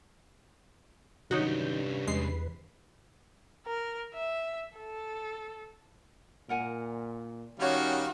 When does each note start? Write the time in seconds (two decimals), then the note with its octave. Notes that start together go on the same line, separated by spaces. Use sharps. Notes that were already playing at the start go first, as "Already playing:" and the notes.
1.31 C2 G2 D#3 F#3 C#4 D#4 F#4 G6
2.08 E2 G#3 B4 C7
3.66 A#4
4.14 E5
4.77 A4
6.49 A#2 A#4 F#5 G#5
7.59 D#3 G3 C#4 F#4 G4 C5 C#5 F5